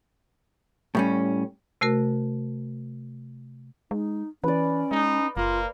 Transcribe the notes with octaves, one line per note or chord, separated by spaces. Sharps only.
A2 G3 C#4
C3 A3 F#4 A#4
G#3 D#4
E3 C#4 B4 D5
G#3 D#4
F#1 A#3 F4